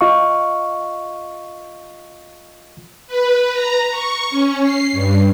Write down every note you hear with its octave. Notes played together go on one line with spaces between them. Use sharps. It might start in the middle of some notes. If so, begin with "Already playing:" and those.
F4 D#5 F5 C#6
B4
A#5
C#6
C#4
C7
G2